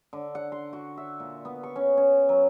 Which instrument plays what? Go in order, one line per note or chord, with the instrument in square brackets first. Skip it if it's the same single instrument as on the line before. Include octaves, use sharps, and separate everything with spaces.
[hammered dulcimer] D3
F#5
C6
F#4
E5
A#2
B3
C#6
C#4
C#4
F#3